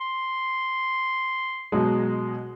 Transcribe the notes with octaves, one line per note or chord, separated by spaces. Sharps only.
C6
B2 F#3 G#3